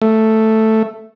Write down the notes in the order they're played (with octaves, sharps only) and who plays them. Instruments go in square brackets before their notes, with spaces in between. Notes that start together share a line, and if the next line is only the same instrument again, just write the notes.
[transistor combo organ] A3